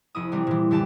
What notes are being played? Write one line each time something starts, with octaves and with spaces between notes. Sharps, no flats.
F1 E4 D#6
C3 E3 G3 C4
A#2 E3
F#2 D3 E3 G4 A5